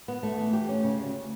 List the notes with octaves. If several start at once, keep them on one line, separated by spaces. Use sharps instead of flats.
B3
A3
E3
G4
C#4
C#3
D2